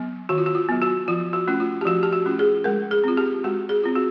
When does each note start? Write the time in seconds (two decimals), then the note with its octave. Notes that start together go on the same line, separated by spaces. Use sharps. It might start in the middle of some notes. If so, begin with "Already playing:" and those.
Already playing: F#3 B3
0.29 D#3 F#4
0.38 F4
0.46 F#4
0.55 F4
0.69 F#3 B3
0.82 F#4
1.08 F3 F4
1.33 F#4
1.47 A3 C#4 F4
1.60 F4
1.81 G4
1.86 F3 F#4
2.03 G4
2.13 F#4
2.26 A3 C#4 F4
2.39 G#4
2.64 G#3 A#4
2.91 G#4
3.04 C4 F4
3.17 G4
3.44 G#3 F#4
3.69 G#4
3.84 C4 F4
3.95 F#4